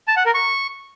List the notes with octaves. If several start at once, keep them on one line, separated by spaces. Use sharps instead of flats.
A5
F#5
A#4
C#6